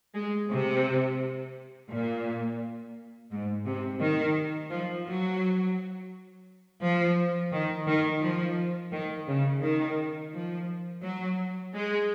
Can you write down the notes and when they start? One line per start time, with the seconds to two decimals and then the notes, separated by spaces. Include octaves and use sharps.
0.15 G#3
0.50 C3
1.91 A#2
3.31 G#2
3.66 C3
4.01 D#3
4.71 F3
5.07 F#3
6.82 F3
7.52 D#3
7.87 D#3
8.22 F3
8.93 D#3
9.28 C#3
9.63 D#3
10.33 F3
11.03 F#3
11.74 G#3